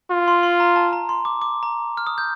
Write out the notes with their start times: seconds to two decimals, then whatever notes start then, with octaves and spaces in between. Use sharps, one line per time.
0.11 F4
0.28 C6
0.43 C6
0.60 A#5
0.76 A5
0.93 A#5
1.09 C6
1.25 D6
1.42 D6
1.63 A#5
1.97 F6
2.07 D#6
2.18 G6